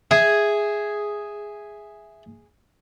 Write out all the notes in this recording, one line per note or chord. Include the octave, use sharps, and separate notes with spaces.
G#4 E5 G#5